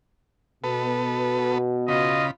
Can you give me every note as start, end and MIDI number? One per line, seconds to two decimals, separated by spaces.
0.64 2.27 47
0.64 1.58 59
0.64 1.58 69
0.64 1.58 71
1.88 2.31 49
1.88 2.27 65
1.88 2.27 75
1.88 2.31 83